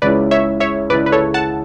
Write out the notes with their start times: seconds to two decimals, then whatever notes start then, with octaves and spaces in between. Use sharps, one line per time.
0.02 C#2 C#3 G#3 C#4 E4 B4 D5
0.31 C#5 E5
0.60 C#5 E5
0.90 C#2 C#3 G#3 C#4 E4 B4 D5
1.06 B4
1.12 A4 C#5
1.34 F#5 A5